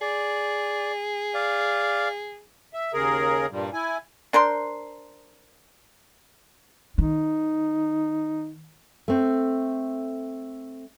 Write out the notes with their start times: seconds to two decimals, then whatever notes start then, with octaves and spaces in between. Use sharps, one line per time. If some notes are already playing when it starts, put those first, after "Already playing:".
0.01 G#4 D5
1.34 D5 F5
2.74 E5
2.93 D#2 C#3 G#4 A#4
3.51 G2 A#2 G3
3.73 E4 G#5
4.33 D4 A#4 C5 C6
6.98 D#3 D#4
9.08 A3 C4